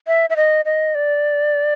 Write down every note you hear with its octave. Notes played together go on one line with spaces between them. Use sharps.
E5
E5
D#5
D#5
D5